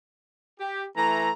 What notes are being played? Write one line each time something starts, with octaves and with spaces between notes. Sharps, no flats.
G4
E3 A3 A#5